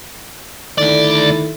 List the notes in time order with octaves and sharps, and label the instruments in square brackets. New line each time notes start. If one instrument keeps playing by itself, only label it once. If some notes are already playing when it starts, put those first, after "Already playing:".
[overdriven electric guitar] D2 D5 [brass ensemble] D#3 E4 A4